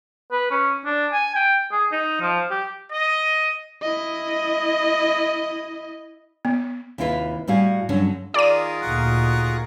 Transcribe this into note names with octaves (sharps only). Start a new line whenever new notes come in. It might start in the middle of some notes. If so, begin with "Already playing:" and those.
B4
C#4
D4
G#5
G5
G#4
D#4
F3
G4
D#5
E4 D#5
B3
D#2 C3 E4 F4 B4
A2 G3 F#4 G4 F5 G#5
G2 D3 F#3 C#4
D#3 F4 G#4 A#4 D5 D#7
D2 A#2 D#4 F#5 C#6